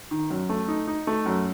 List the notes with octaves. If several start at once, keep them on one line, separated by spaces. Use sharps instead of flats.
D#3
F#2
A3
D#4
D#4
A3
F#2